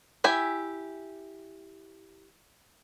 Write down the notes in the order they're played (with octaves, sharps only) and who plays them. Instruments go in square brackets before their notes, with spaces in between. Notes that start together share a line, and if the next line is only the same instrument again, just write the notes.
[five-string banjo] E4 G4 E5 G#5